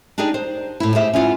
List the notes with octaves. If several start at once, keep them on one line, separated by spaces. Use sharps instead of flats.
D4 D#4 G4 G#4 D5
C5
A2 E4
G4 G#4 C5 E5
C#4 E4 F4 F#5